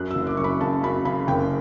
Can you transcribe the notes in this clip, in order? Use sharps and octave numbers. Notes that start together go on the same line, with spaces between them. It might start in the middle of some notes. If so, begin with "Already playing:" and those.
Already playing: F#2 F#6
F#1 E6
D6
F#2 C#6
B5
C#3 A5
F#2 B5
C#3 B5
F#1 G5